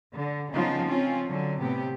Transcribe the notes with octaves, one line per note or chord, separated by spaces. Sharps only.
D3
C#3 F3 B3 D#4 F4
C4 C#4 F4
D3 F#3
A2 C3 B3 G4